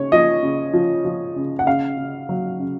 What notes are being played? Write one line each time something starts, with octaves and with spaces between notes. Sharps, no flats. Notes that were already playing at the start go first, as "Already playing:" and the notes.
Already playing: C#3 C#5
F3 D#5
C#3
F3
F3
C#3
F#5
C#3 F5
C#3
F#3
C#3